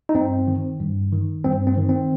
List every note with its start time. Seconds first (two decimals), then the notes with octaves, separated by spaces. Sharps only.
0.09 D#4
0.15 G2 C4
0.47 D#3
0.80 G2
1.13 D#3
1.45 G2 C4
1.67 C4
1.77 D#3
1.89 C4